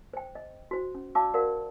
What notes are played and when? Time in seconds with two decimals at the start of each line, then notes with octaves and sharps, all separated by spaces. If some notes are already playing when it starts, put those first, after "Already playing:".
0.14 C5 G5
0.35 D#5
0.71 F#4 C5
0.95 C#4
1.15 F#4 D5 F5 A5 D6 E6
1.34 F#4 A#4 C5 D5 F5 F#5